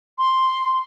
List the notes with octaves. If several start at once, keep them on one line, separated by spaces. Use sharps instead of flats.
C6